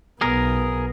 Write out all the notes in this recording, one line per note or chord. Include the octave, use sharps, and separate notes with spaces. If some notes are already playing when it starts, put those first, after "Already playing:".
B1 B3 G#4 A#4